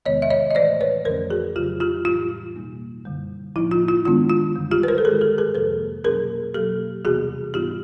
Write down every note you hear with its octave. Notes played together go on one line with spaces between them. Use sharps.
E2 C3 D#3 G#3 B3 C#5 D#5
E5
C#5 D#5
D#5
A2 E3 A3 C5 D5
B4 C#5
F2 D3 F3 A3 C#4 A#4 C5
F#4 G#4
F2 C#3 F#3 F4 G4
F4 G4
A2 E3 G3 F4
B2 G3 A#3 D#4
F#2 D3 G3
A2 F3 A#3 D#4 E4
F4
F4
G2 D#3 G#3 B3 D4 F4
F4
F#2 D3 G3
F4 G4
B4
A#4 C5
A4
G#2 D#3 G#3 G#4 A#4
G4 A4
G#4 A#4
F2 C3 F3 A#3 A4 B4
B2 F#3 A#3 C#4 G#4 A#4
B2 F#3 A#3 G4 A4
E2 C3 E3 G3 B3 F#4 G#4
G#2 E3 G3 B3 D#4 F4 G4